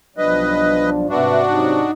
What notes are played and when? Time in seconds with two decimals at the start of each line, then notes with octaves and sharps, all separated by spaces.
0.18 B1 F3 G3 D4 B4 D#5
1.10 G#2 C3 D4 F#4 B4 E5
1.51 C3 F#3 D#4